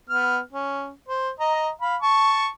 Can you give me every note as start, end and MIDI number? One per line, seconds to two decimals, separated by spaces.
0.09 0.39 59
0.09 0.39 89
0.52 0.90 61
1.08 1.30 72
1.40 1.69 75
1.40 1.69 82
1.81 1.96 77
1.81 1.96 83
2.02 2.49 81
2.02 2.49 85